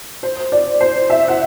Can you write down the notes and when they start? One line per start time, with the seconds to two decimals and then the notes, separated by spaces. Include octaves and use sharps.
0.23 C5
0.52 D5
0.80 C5
1.10 E5
1.28 F#5